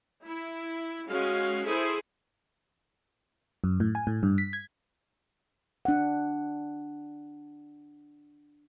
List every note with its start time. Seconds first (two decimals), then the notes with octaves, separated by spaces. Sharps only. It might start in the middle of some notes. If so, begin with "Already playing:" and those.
0.25 E4
1.08 G#3 C#4 F#4 F5
1.66 E4 G#4 A4 C5
3.64 F#2
3.80 A2
3.95 G#5
4.07 A2
4.23 G2
4.38 B6
4.53 G#6
5.85 D4 F#5